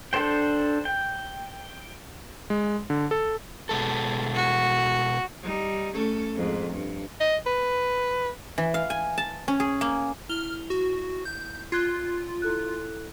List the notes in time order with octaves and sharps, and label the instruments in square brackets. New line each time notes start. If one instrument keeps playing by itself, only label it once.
[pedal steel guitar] D4 A4 C5 G5
G5
[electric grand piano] G#3
D3
A4
[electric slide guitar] B2 G#3 A4
[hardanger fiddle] F#4
[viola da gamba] G3 D#4
A3 C#4 A4
F2 G#2
G2
[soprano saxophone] D#5
B4
[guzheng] E3
F5
G#5
A5
C#4
G#4
A#3
[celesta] E4 F7 G7 [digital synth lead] F6
[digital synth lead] F#4
G6
[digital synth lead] F4 [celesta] F#6 G#6 C7
[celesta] E4 A4 F#6